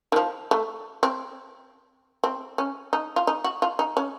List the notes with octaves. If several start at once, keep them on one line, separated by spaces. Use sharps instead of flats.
D#3
F3
A3
C4
C4
C#4
D#4
F4
D#4
F#4
F4
D#4
C#4